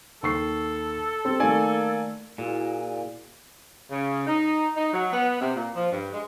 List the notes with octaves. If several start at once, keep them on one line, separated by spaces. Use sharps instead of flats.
D#2 A4 C#6 C7
C4 G4
D#3 A3 A#3 D5 G#5
A#2 E4 F#4 G#4
C#3
D#4
D#4
F#3
B3
C3
A#2
F3
G2
G#3